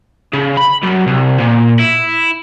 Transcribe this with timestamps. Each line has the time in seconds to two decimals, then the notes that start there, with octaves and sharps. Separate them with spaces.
0.33 C#3
0.57 B5
0.83 F#2
1.07 C2
1.40 A#2
1.79 E4